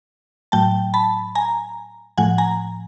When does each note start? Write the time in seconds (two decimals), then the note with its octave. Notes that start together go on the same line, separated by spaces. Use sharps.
0.52 A2 F#3 A3 G5 A5
0.94 A5 B5
1.35 G#5 A#5
2.18 A2 F3 A3 F#5 G#5
2.38 G#5 A#5